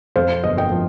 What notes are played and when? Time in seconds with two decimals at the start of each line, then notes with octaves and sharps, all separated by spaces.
0.16 F2 C5 F5
0.44 G1 D#5
0.57 D#5 G5
0.72 F3